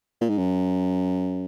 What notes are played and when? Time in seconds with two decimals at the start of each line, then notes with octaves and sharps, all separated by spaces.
0.21 A#2
0.29 G#2
0.38 F#2